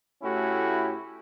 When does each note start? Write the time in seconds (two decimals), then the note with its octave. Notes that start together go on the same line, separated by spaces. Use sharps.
0.23 A2 A3 C#4 E4 F#4 G4